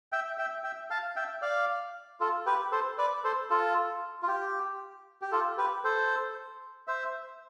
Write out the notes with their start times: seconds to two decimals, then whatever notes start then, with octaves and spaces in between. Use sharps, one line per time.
0.12 E5 G5
0.38 E5 G5
0.64 E5 G5
0.90 F5 A5
1.16 E5 G5
1.42 D5 F5
2.20 F4 A4
2.46 G4 B4
2.72 A4 C5
2.98 B4 D5
3.24 A4 C5
3.50 F4 A4
4.23 F4
4.28 G4
5.22 G4
5.32 F4 A4
5.58 G4 B4
5.84 A4 C5
6.87 C5 E5